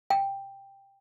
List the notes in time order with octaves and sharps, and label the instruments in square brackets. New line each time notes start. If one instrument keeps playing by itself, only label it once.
[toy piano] G5